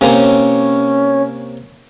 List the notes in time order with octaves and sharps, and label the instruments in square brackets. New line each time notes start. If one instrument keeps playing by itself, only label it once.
[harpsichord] C3 A#3 C5 [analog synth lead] C#4